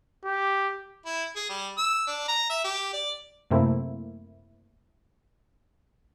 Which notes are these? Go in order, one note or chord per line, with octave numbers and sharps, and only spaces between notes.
G4
E4
G#4
G3
E6
D4
A#5
E5
G4
D5
F#2 C3 A3 A#3 C4 E4